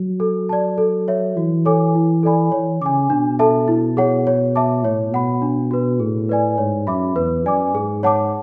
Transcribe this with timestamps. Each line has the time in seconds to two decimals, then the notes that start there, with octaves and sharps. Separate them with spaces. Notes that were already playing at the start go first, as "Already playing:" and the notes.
Already playing: F#3
0.20 A4
0.49 D5 A5
0.78 A4
1.08 C#5 E5
1.36 E3 F#4
1.66 A4 C#5 G#5 D6
1.95 E4
2.23 A4 D5 G#5 B5
2.52 E3 C#5
2.81 C#3 G#5 D6
3.10 B2 D4
3.39 A4 E5 A5
3.68 E4
3.97 G#4 C#5 F#5
4.27 C#5
4.56 E5 A5 D6
4.84 A2 C#5
5.13 B2 F#5 B5
5.42 D4
5.71 F#4 B4
6.00 A2 G#4
6.29 B4 D5 G#5
6.58 G#2 C#5
6.87 F#2 E5 B5 D6
7.16 E2 B4
7.45 F#2 D5 G#5 D6
7.74 G#2 G#4
8.03 C#5 F#5 A5 D6